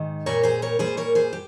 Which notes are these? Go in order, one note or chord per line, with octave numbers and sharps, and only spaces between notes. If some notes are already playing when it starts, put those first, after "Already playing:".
Already playing: G#2 D#3
A#2 G3 A#4 C#5
G#4 C5
A#4 C#5
A#2 G3 G#4 C5
A#4 C#5
G#4 C5
G4